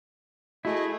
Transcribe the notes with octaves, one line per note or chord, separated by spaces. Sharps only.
A3 E4 F#4 G#4 D#5